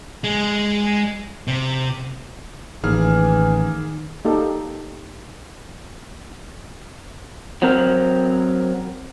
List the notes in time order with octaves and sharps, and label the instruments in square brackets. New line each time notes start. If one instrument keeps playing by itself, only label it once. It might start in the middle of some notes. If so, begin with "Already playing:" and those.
[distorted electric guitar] G#3
C3
[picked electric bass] A1 [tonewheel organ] D#3 [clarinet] E3 [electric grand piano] A#3 G#4 F6
[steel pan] A#3 D#4 G4 A4
[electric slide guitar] F#3 C4 A#4